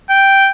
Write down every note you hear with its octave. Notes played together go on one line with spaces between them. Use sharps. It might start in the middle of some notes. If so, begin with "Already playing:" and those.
G5